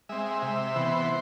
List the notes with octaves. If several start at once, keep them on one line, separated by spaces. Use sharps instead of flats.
G#3 C4 E5
E5
C3 E5
E3 B3 C5